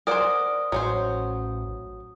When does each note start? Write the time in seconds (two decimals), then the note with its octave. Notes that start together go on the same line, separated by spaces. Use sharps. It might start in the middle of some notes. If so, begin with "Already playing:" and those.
0.07 A#4 C5 D5 F#5 G#5 D#6
0.72 A1 F#3 C#4 C5